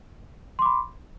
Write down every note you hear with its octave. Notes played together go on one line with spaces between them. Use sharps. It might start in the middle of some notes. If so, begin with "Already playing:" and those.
B5 C6 D6